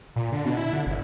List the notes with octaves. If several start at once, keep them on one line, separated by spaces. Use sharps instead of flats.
A#2
D3
B2
E4
D3
G1